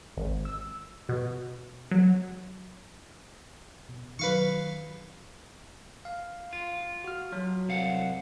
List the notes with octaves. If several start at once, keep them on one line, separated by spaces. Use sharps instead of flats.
G#1
E6
B2
F#3
B2
D#3 F#3 B4 F5 C#6
F5
F4
F#4 F6
F#3
C2 F5 F#5